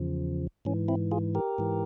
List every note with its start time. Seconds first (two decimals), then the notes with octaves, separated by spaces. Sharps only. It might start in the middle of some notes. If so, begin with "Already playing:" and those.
Already playing: E2 C#3 F3
0.65 G#2 E3 C#4
0.88 C4 E4
1.11 F4 G#4
1.35 G4 A#4
1.58 G#2 E3